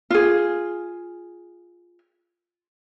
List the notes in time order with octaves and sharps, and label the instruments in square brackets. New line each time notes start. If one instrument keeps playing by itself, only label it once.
[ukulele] F4 G#4